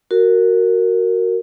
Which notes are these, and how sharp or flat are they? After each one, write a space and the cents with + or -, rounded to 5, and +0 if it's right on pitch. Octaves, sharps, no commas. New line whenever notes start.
F#4 +0 A#4 -15